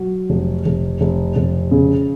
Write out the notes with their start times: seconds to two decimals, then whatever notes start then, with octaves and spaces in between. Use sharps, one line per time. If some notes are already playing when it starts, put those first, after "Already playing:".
Already playing: F#3
0.30 F1
0.66 F1
1.01 F1
1.36 F1
1.71 C#3